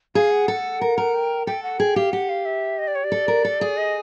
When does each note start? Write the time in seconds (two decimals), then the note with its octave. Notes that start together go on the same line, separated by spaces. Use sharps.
0.15 G#4 F5
0.31 F#5
0.48 A4
0.81 A#4
0.98 A#4
1.14 G5
1.47 A4 G5
1.63 F#5
1.80 G#4 G5
1.96 G4 F5
2.12 G4 F#5
2.29 F5
2.45 E5
2.79 D#5
2.87 D5
2.95 C#5
3.04 D5
3.12 A4
3.28 A#4
3.45 A4
3.61 G#4
3.77 D#5